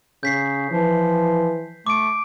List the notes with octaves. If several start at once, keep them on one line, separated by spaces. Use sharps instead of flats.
C#3 G6 B6 C7
E3 F3
A3 D6 D7